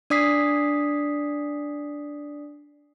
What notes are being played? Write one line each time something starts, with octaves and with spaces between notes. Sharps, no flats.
D4 D5 D#6 B6 C7